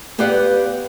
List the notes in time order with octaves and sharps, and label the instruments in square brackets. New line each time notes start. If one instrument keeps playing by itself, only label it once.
[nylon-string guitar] B3 G4 B4 D5 F5 F#5